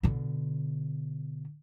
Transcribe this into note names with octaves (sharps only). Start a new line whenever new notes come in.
B2 D3